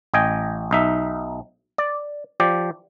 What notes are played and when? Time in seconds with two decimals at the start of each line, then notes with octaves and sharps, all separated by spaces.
0.14 A1 D#5 G5 G#5
0.71 B1 D#4 E5
1.78 D5
2.40 F3 G4 D5